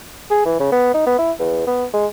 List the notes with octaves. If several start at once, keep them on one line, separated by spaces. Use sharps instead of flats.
G#4
E3
C#3
B3
D#4
B3
E4
E2
B3
G#3